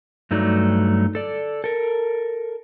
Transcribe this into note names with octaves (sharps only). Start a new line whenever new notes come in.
G2 F#3 A3 D#4 D5
A4 D5
A4 A#4